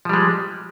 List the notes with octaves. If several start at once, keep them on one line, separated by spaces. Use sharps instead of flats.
F3 G3 G#3